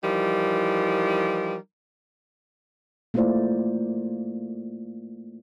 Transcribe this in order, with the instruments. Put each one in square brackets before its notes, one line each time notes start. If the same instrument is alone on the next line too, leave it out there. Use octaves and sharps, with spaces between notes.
[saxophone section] E3 F3 G3 D#4 A#4
[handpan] A3 A#3 E4 F4 C5 D5